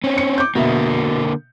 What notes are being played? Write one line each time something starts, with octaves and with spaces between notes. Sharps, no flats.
C4 C#4
C#7
D6 G6
B2 D3 A#3 E5